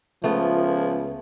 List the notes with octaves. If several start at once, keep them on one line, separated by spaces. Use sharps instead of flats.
C#2 F3 A3 B3